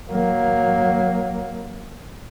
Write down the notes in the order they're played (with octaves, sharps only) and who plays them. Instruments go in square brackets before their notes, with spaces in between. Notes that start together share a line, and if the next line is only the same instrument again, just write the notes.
[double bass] F#3 A#3